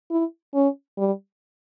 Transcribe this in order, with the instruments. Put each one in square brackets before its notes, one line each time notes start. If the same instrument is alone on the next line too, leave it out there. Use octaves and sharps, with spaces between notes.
[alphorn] E4
C#4
G3